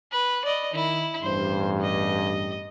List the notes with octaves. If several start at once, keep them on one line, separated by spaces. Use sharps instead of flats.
B4
D5 D#5
D#3 E4
A1 E2 G2 C5
D#5